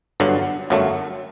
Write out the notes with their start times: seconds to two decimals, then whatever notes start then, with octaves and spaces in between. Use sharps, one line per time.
0.20 G1 G2 D3 F#3
0.70 G1 F#2 F#3 A3